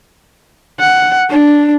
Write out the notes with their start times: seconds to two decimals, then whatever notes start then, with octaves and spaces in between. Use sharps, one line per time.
0.80 F#5
1.30 D4